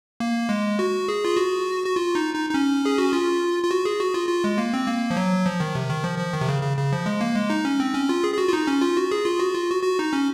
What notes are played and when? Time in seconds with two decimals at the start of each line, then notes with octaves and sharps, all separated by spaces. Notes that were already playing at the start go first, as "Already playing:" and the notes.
0.20 A#3
0.49 G#3
0.79 F#4
1.08 G#4
1.25 F4
1.37 F#4
1.86 F#4
1.96 F4
2.15 D#4
2.34 D#4
2.50 D#4
2.54 C#4
2.85 G#4
2.98 F#4
3.13 F4
3.64 F4
3.71 F#4
3.85 G#4
4.00 F#4
4.14 F4
4.29 F4
4.44 G#3
4.58 A#3
4.74 C4
4.87 A#3
5.10 F3
5.17 F#3
5.46 F3
5.60 D#3
5.75 C3
5.90 D#3
6.04 F3
6.18 F3
6.33 D#3
6.41 C3
6.48 C#3
6.62 C#3
6.77 C#3
6.93 F3
7.06 G#3
7.21 A#3
7.36 G#3
7.50 D#4
7.65 C#4
7.80 C4
7.94 C#4
8.09 F4
8.24 G#4
8.34 G#4
8.38 F#4
8.48 F4
8.53 D#4
8.67 C#4
8.81 F4
8.97 F#4
9.11 G#4
9.25 F4
9.40 F#4
9.54 F4
9.70 F#4
9.83 F#4
9.99 D#4
10.13 C#4